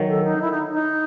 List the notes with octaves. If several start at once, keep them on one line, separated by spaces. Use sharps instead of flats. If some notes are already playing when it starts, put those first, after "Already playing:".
Already playing: D#3 F#3
A4
D#4
E4
D#4
D#4